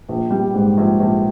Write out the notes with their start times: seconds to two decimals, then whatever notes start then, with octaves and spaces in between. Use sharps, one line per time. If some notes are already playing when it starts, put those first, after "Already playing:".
0.09 A#1
0.31 G3
0.54 G#2
0.77 A#1
1.00 A#1